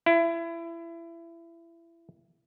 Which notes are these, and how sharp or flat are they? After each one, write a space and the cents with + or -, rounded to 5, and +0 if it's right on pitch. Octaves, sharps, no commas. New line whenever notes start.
E4 +25